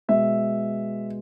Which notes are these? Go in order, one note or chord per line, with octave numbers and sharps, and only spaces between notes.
B2 G#3 E5